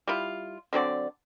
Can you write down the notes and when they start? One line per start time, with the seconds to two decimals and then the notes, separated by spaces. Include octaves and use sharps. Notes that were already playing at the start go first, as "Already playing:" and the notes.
0.07 G3 E4 F4
0.73 D3 F#3 C4 D5